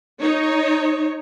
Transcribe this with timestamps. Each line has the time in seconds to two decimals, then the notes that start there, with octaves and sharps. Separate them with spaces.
0.22 D#4 C#5